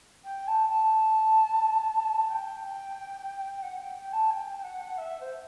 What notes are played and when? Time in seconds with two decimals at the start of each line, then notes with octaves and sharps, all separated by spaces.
0.24 G5
0.47 A5
0.69 A5
2.27 G5
3.62 F#5
3.78 G5
3.96 G5
4.12 A5
4.30 G5
4.63 F#5
4.97 E5
5.20 C5